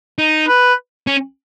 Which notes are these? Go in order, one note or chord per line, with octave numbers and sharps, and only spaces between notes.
D#4
B4
C#4